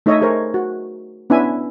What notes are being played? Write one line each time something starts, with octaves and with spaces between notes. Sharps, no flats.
A3 D#4 A4 C#5 D#5 E5
G#4 A#4 C5 C#5
F#4
B3 C#4 D4 E4 E5 G#5